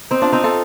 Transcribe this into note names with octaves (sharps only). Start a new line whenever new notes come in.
C4 D#4
D4 F4
C4 D#4
F4 A4